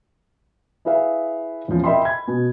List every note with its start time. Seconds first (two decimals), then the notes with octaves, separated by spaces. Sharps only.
0.85 E4 G#4 B4 E5 F5
1.68 E2 A#2 F3 C#4
1.84 A#4 D#5 E5 G5 B5 C6
2.02 B5 G#6
2.28 B2